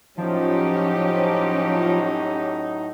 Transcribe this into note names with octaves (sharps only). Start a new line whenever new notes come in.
A2 F3 F#3 C#4 D#4 G4